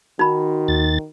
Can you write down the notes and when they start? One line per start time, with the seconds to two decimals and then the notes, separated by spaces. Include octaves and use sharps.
0.19 D#3 D#4 F#4 B5
0.68 D#2 A6